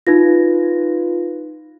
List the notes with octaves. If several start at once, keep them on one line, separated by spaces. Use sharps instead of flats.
D#4 F4 B4 A#6